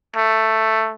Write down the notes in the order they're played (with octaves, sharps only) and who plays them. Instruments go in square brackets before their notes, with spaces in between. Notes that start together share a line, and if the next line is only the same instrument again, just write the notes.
[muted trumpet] A3